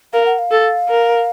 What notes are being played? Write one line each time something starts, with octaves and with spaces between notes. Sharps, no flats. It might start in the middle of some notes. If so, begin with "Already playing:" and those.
A#4 F5
F#5
F5
A4
A#4